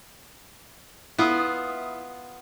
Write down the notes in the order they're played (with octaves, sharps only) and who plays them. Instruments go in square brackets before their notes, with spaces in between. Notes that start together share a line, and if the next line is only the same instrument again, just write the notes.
[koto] B3 F4 [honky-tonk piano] E4 D#6